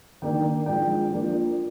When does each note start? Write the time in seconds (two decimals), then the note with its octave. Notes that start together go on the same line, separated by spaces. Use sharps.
0.22 D#3 A#3 D4 G5
0.66 F3 G#3 D4 G5
1.10 F3 A#3 D4